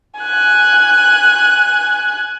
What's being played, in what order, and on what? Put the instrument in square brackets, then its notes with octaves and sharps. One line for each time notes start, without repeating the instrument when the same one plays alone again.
[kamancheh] G#5 F#6